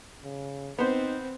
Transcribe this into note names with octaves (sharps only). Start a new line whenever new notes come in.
C#3
B3 C4 D#4 C5